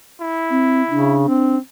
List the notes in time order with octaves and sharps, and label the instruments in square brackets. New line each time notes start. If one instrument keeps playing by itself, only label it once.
[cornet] E4
[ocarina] C4
[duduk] C#3 [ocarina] D4
[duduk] C4